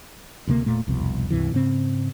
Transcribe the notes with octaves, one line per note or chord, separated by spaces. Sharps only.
D2 C3 A3 A#3
E1 A#2 A3
E1 C2 F2 B2
C#2 G2 C3 E3
G#2 C#3 C4